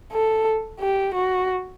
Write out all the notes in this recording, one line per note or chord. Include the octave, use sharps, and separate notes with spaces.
A4
G4
F#4